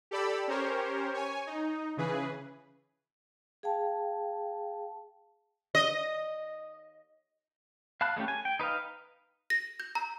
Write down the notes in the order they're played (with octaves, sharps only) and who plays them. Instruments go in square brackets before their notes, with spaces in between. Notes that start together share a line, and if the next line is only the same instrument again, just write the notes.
[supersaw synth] G4 A4 D5 B5 E6
C#4 G4 A#4 C5 C#5
C#5 G#5
D#4
C#3 E3 G#4 B4
[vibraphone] G#4 F5 G5 A5
[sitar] D#5
[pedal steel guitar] F5 A5 B5 F#6
G#3 A3 C#4 G4
G#5
G5
D#4 B4 D#5 F5
[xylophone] A#6
G6
A#5